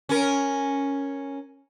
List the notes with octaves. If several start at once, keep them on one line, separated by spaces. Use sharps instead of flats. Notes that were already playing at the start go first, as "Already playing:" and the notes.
C#4 A#4